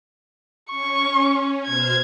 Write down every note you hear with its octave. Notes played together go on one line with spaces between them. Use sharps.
C#4 C#6
B2 C5 F6 G#6